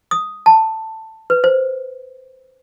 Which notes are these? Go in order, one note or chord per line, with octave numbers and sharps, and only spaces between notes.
D#6
A5
B4
C5